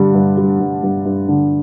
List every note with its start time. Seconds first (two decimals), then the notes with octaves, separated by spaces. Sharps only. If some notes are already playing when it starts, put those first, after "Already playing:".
Already playing: G2 D3 G3
0.14 G2
0.37 G3
0.60 G2
0.83 G2
1.05 G2
1.28 D3